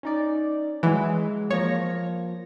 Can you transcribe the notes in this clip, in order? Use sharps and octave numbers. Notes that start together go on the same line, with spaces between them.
C#4 D#4 D5
E3 F#3 G#3
F3 A#3 C#5 A#6